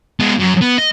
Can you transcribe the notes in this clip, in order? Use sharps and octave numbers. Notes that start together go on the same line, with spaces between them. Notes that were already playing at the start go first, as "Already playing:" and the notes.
G#3 B3
F#2
B3
D#5